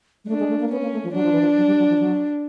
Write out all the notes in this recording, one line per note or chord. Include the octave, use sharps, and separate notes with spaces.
G#3
A3 D4
G#3
A3
A#3
B3 C#4
A#3
A3
F3
F#3 D4
F3
E3
F3
F#3
G3
F#3
F3
F#3